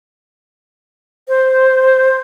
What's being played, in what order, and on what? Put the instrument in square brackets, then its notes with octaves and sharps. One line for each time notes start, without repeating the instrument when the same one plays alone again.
[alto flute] C5